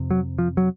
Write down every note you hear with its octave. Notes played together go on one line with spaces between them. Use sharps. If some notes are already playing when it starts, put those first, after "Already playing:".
Already playing: F2 C3
F#3
F3
F#3